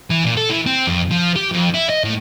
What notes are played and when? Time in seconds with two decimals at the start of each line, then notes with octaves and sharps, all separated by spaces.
0.10 E3
0.24 A#2
0.37 A4
0.50 E3
0.66 C4
0.87 F2
1.11 F3
1.36 G4
1.52 F2
1.74 E4
1.90 D#5
2.04 A2